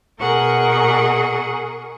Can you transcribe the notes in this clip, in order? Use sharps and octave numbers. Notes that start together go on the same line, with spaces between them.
B2 G#4 A#4 F#5 C#6